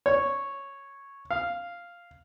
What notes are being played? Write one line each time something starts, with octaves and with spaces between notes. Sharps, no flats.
C#5
F5